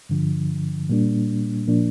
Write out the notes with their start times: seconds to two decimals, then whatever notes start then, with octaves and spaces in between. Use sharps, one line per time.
0.09 G2 D3 F3
0.89 A#2 G3 A#3 D4
1.67 A#2 F3 A#3 D4